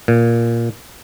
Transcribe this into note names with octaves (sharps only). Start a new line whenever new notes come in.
A#2